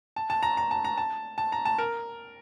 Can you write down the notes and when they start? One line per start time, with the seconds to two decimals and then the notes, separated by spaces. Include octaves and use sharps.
0.16 A5
0.30 A5
0.43 A#5
0.57 A#5
0.71 A5
0.85 A#5
0.97 A5
1.38 A5
1.52 A#5
1.65 A5
1.79 A#4